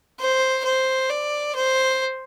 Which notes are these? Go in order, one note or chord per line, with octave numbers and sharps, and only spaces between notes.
C5
C5
D5
C5